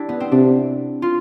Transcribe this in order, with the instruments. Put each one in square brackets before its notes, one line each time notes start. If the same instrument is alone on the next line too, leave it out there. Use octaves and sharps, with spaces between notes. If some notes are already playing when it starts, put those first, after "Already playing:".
Already playing: [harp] D4 E4 G4
B3
C4
[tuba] C3 [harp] D4
[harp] F4